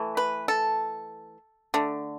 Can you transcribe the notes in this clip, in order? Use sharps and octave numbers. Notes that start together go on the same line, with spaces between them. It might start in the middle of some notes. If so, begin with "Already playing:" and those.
Already playing: E3 A3
B4
A4
D3 A3